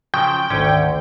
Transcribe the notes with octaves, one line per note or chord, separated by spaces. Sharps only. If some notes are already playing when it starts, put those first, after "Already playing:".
C#3 F3 F#3 G5
G#1 D2 D3 D#3 C#4